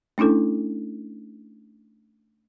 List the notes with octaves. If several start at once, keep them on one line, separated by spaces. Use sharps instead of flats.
A3 C#4 D4 E4 A4